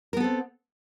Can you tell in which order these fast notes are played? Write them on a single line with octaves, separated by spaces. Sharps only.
A#4 B3 A4 C4